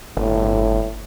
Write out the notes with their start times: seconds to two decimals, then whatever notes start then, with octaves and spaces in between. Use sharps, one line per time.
0.17 G1 A2